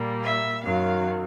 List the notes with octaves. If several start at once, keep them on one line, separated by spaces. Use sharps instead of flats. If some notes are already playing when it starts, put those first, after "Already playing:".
Already playing: A#2 G3 A#3
E5
F#2 D#3 F#3 F5